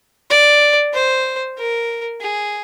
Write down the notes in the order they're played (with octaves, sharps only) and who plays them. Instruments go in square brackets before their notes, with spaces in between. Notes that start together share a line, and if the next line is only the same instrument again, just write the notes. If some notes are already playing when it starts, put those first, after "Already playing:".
[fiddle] D5
C5
A#4
G#4